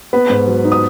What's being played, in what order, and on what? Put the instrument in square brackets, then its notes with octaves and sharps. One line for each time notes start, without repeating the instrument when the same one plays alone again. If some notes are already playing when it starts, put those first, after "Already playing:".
[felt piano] B3 B4 B5
G#2
F#3
D#4
D#6